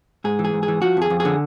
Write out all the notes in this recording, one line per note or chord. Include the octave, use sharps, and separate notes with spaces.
G#2 G#4
E3
G#4
G#2
G#4
E3
F3 F#4
F2
G#4
F2
G#4
D3